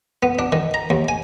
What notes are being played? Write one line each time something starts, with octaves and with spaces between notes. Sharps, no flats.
B3
D4
D#3
A#5
D#2
G#5